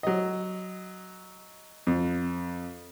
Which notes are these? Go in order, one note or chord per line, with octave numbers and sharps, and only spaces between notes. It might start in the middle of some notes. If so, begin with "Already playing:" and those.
F#3 D#5
F2